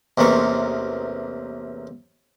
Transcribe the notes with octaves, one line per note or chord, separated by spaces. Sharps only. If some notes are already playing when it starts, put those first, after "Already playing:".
A1 E2 C3 A#3 C#6